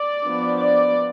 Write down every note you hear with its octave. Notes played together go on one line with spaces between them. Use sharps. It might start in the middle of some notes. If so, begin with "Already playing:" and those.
Already playing: D5
F3 B3 D4
D5